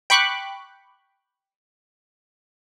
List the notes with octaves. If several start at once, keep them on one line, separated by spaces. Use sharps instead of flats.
G5 B5 C#6 D6 F#6